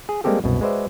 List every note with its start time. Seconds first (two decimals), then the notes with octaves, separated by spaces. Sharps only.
0.09 G#4
0.24 G3 G#3 A#3 C4 G4 A4
0.44 C2 F#2 B2
0.61 G#3 F#4 B4 C5 D5 E5